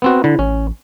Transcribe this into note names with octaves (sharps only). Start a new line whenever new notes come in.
B3 C4 F#4
D3 E4
A1 C#4